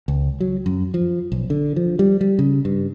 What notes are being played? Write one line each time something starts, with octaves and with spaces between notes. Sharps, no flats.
C#2
F#3
F#2
F3
B1
D3
F3
G3
G3
C#3
G2